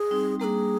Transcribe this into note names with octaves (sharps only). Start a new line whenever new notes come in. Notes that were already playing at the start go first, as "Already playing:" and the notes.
Already playing: G#4
G3 C4 D#4
G3 A#3 D4 G#4 A#4